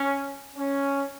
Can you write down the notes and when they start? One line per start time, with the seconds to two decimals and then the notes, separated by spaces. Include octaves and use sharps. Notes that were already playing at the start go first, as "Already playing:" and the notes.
Already playing: C#4
0.57 C#4